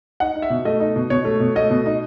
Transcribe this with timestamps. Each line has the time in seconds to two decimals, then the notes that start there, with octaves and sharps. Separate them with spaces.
0.20 D#4 F#5
0.36 D#4
0.42 E5
0.50 B2
0.65 A3 D#5
0.80 D#4
0.96 B2
1.10 B2 C#5
1.25 A3
1.40 B2
1.55 A3 D#5
1.70 B2
1.86 D#4